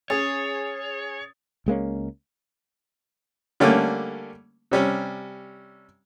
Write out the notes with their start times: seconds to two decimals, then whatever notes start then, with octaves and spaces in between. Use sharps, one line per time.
0.10 C#4 G#4 C#5 D#6 A6
1.66 C#2 G#3 A#3 C#4
3.60 D3 G3 A3 A#3 C#4
4.71 C3 G3 C#4